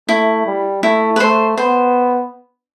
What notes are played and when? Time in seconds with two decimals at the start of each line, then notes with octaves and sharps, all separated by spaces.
0.08 A3 E4
0.46 G3
0.83 A3 E4
1.16 B4
1.20 A3 C5
1.58 B3 C5